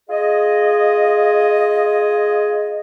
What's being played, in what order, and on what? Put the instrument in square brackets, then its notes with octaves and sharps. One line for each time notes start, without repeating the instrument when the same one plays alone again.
[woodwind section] F4 G#4 D#5